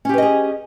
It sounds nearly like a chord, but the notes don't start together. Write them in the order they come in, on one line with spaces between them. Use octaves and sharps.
C#4 G4 B4 D#5 G#4